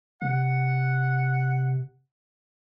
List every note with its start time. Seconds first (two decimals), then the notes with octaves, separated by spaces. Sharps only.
0.22 C3 F#5